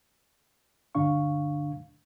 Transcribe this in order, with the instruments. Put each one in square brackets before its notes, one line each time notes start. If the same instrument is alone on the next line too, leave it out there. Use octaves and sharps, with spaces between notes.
[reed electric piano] D2 G2 D3 D4 F5 C#6